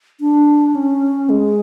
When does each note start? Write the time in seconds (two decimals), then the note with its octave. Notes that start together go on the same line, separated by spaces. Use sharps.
0.21 D4
0.75 C#4
1.29 G#3